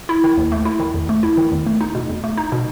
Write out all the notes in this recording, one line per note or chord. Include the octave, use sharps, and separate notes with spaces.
E4
D#3
D#2
A3
E4
D#3
E2
A3
E4
D#3
E2
A3
D#4
B2
E2
A3
D#4
B2